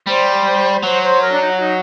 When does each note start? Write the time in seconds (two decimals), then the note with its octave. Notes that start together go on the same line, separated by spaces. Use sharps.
0.07 G3 C5
0.83 F#3 C5
1.02 C5
1.21 A#4
1.31 D4
1.41 D#4
1.49 F#4
1.59 D#4